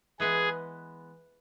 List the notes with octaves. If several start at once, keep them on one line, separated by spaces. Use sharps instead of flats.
E3 G#3 B3 G#4